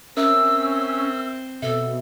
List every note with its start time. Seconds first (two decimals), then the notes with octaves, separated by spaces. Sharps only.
0.17 C4 C#4 A#4 E5 E6
1.62 B2 A4 E5